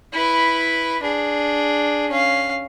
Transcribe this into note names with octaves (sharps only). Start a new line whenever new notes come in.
E4 B4
D4 G#4
C#4 F5